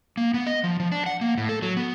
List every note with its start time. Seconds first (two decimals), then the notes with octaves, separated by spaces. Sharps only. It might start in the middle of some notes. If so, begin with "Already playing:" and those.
0.17 A#3
0.34 B3
0.46 D#5
0.64 F3
0.80 F3
0.92 D4
1.06 F#5
1.21 A#3
1.37 A2
1.49 A4
1.62 F#3
1.77 B3